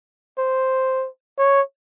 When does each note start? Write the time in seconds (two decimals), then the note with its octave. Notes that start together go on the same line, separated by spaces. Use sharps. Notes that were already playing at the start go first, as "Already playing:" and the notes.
0.38 C5
1.38 C#5